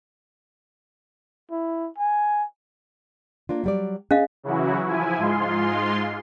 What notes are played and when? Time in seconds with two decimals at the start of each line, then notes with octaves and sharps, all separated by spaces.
1.51 E4
1.98 G#5
3.49 A#3 D4 F4
3.64 F#3 G3 D5
4.11 C#4 G#4 D#5 F5
4.43 C#3 E3 F#3 E4 F#4
4.87 F3 E4 G#5
5.18 G#2 G#3 F4 C6